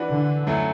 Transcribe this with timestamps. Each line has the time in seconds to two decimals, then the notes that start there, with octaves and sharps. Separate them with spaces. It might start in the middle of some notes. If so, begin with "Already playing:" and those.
Already playing: E3 D4 F#4 B4
0.10 D3
0.47 F#2 F#3 A3 E4